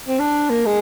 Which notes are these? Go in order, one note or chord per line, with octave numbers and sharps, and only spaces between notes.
C4
D4
A#3
G#3